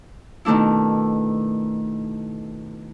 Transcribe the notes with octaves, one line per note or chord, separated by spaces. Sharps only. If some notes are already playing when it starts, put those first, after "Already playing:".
B2 D#3 A3 D4 E4